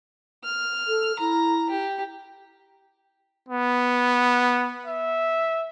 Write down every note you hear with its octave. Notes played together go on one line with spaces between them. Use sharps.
F6
A4
E4 A#5
G4
B3
E5